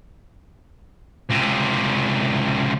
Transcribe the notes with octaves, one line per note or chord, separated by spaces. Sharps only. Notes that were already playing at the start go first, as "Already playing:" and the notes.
C#2 C3